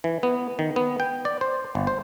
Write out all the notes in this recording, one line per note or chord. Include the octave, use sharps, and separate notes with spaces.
E3
B3
D#3
B3
G5
D5
C5
G1
C5